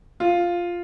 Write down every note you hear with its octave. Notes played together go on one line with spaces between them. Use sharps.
F4